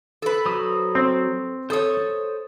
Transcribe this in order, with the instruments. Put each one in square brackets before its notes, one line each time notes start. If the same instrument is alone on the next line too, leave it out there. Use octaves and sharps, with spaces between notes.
[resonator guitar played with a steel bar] A4 B4
[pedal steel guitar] F#3 C5 D#6
[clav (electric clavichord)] C4
[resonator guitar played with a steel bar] A4 C#5 [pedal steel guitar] C5 D#6